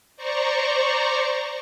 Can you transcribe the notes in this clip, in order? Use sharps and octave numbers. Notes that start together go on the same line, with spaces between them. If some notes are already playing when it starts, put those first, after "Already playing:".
C5 D5 A#5 C#6